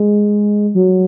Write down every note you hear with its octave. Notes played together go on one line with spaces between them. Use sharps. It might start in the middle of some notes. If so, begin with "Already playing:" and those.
Already playing: G#3
F#3